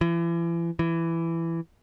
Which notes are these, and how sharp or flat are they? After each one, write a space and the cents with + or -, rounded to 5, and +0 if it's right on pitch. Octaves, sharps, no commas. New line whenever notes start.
E3 +40
E3 +15